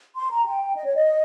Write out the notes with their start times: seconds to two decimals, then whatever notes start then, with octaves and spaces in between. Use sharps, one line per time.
0.17 C6
0.32 A#5
0.47 G5
0.76 D#5
0.85 C#5
0.95 D#5